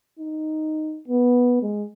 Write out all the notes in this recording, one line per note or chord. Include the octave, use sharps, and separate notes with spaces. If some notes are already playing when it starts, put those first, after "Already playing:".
D#4
B3
G#3